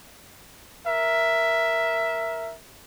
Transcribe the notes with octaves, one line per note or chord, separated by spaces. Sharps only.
A#4 E5